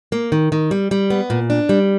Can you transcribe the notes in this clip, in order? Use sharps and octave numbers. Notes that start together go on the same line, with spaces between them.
A#3
D#3
D#3
G3
G3
B3
A#2
D4
G3